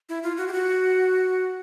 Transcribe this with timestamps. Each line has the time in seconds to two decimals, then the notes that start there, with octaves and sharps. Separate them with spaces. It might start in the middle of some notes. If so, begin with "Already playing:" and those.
0.09 E4
0.23 F4
0.37 F#4
0.48 G4
0.53 F#4